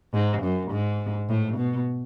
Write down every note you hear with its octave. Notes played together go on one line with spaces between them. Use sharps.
G#2
F#2
G#2
A2
B2